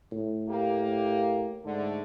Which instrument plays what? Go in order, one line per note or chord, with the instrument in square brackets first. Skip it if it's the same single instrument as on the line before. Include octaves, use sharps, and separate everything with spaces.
[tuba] A2
[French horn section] A#3 G4
[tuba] G#2 [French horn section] D3 A3